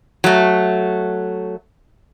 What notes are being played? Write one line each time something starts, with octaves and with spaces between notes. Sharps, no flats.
F#3 A3